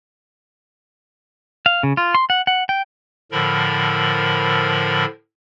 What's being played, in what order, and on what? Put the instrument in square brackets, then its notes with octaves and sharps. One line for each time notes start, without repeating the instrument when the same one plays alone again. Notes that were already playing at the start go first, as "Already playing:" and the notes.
[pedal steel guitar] F5
C#3
F4
C6
F#5
F#5
G5
[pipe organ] A2 D3 F3 A#4 B5